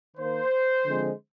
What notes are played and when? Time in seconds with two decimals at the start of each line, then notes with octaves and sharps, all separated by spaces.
0.16 D#3 A#3 C5
0.85 D3 F3 G#3 C4